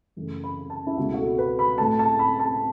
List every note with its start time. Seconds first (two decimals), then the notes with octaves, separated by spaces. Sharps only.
0.16 F#2 C#3 E3 A3
0.44 B5
0.70 A5
0.87 E4
0.98 C#2 B2 A3 F#4
1.14 F#4
1.18 A4
1.38 B4
1.59 B5
1.78 A2 A3 A5
1.99 A5
2.19 B5
2.39 A5